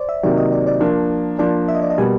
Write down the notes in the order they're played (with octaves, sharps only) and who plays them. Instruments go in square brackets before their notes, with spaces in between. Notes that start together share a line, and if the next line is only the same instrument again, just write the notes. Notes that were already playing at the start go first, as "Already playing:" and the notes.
Already playing: [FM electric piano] C5 D5
E5
[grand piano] C3 D#3 F#3 A#3 [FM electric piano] D5
[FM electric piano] D#5
D5
D5
[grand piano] F3 A#3 D4
[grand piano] F3 A#3 D4 [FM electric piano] D5
[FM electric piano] E5
D#5
D5
D#5
[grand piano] B2 G3 A#3 [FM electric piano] G#5